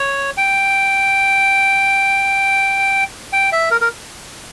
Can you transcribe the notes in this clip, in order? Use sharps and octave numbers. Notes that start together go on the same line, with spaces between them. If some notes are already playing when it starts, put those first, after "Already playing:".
Already playing: C#5
G5
G5
E5
A#4
A#4